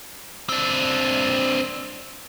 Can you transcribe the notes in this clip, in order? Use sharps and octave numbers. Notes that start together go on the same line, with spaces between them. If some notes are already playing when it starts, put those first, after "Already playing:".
C4 D4